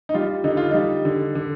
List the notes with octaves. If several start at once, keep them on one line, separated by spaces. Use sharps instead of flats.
D#4
G3 F4
D3 D#4
F4
G3 D#4
D3
D3